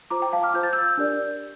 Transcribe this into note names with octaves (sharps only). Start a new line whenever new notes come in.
F4 C5 A#5 D6
G5 A#5
F5 A5
D6 F6
F4 C5 G6
A6
E6 G6
D4 G4 A#4 D5